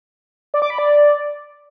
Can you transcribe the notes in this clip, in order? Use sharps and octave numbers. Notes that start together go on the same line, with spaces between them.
D5
D6
B5
D5